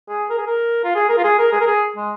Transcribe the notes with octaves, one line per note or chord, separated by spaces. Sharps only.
G#4
A#4
G#4
A#4
F4
G#4
A#4
F4
G#4
A#4
G#4
A#4
G#4
G#3